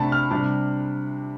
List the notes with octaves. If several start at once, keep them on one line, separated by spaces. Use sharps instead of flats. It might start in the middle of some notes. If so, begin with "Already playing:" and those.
Already playing: C3 A3 D4 A5 B5
F6
C3 G3 D4